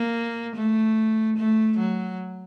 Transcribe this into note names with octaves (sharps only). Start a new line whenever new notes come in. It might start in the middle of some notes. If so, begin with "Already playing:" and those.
Already playing: A#3
A3
A3
F#3